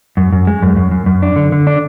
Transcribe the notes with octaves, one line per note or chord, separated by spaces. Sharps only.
F#2
F#2
G#3
F#2
F#2
F#2
F#2
D4
D3
D3
D4